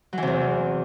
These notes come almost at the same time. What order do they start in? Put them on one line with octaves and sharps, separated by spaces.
F#3 E3 C3 E2